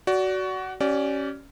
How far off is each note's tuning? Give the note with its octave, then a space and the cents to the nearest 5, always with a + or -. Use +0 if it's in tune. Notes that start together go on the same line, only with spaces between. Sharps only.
F#4 +15 D5 -25
C#4 +0 G4 -40 D5 +0